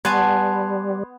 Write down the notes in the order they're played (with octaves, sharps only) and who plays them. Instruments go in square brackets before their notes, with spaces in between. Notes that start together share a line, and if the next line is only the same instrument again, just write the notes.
[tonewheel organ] G3 [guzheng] B3 [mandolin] G#5 A5 C#6 [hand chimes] C6 F#6 G#6